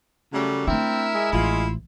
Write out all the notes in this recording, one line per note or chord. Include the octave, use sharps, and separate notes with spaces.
C#3 F#3 G3 A3
A3 C4 D4 E4 A#4 E5
G#3
A1 E4 F4